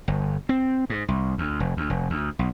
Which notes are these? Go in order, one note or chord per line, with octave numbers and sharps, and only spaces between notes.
G1
C4
G#2
C2
D2
F1
D2
F1
D2
B1